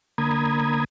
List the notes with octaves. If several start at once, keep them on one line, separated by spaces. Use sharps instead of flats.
D3 A#3 A#5 B5 D#6 G#6